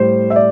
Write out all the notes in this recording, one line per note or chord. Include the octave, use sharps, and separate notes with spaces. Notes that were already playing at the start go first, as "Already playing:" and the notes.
Already playing: A2 G3 C5
E5
D5